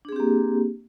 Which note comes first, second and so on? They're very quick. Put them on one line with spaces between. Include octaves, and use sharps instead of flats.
D4 G#4 C4 G4 A#3